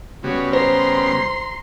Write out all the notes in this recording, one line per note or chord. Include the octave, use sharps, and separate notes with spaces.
C#3 G3 B3 F#4 C#5
C5 A#5 C6 C7